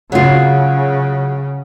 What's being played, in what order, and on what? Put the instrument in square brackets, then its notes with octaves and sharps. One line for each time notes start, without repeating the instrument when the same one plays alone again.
[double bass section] C#3 [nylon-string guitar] F#3 F4